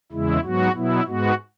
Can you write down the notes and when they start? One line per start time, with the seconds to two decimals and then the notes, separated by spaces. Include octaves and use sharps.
0.12 E2 C#3 G#3 E4
0.44 G#2 F#3 B3 F#4
0.75 B2 F#3 B3 E4
1.07 G#2 G#3 B3 F#4